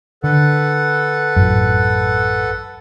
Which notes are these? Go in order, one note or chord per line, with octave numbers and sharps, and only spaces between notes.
D3 A4 B4 F#5
A1 F#2